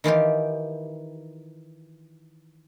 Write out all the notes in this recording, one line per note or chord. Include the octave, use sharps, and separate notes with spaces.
D#3 E3 F4 G4